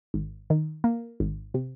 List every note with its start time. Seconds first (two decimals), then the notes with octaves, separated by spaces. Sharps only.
0.14 G#1
0.50 D#3
0.84 A#3
1.20 G#1
1.54 C3